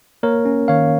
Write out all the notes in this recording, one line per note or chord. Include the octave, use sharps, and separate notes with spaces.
A#3 A#4 C#5
C#4
D#3 C#5 F5